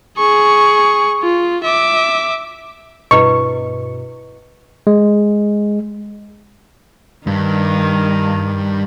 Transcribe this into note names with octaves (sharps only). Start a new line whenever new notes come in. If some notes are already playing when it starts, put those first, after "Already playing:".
G#4 C#6
F4
E5 D6
G2 B2 E4 B4 D#5 C#6
G#3
G2 D#3